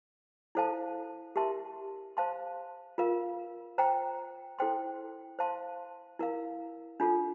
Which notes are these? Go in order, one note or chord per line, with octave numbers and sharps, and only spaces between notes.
E4 A4 C5 F5 A5
G4 A#4 E5 A5 C6
C5 F5 A5 C6
F4 A#4 F5
C5 G5 A#5
E4 A4 C5 G5 C6
C5 F5 A5 C6
E4 A#4 F5
D4 F4 A4